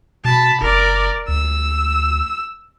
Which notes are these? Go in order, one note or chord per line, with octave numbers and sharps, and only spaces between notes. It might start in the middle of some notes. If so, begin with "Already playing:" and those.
B2 A5 B5
F#1 A#4 D5
D2 E6